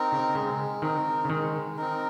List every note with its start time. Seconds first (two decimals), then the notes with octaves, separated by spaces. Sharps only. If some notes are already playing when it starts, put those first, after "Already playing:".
Already playing: C4 D#4 A#4
0.12 C#3
0.35 C#3 G#3
0.82 D#3 C4 D#4 A#4
1.25 C#3
1.30 D#3 G#3
1.77 C4 D#4 A#4